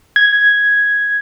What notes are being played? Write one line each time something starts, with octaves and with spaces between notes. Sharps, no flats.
G#6